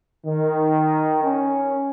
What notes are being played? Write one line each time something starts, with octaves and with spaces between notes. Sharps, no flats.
D#3
C#4